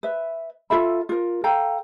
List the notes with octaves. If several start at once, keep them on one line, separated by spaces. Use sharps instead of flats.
B4 E5
F4 A4 E5 B5
F4 A#4
A4 F5 G5 A#5